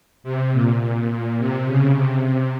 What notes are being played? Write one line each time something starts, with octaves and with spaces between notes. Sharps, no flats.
C3
A#2
A#2
A#2
C3
C#3
C3
C3